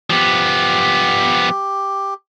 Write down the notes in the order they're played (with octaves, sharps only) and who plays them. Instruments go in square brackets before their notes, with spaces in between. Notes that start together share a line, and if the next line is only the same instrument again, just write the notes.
[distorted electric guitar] F3 B3 [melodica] G4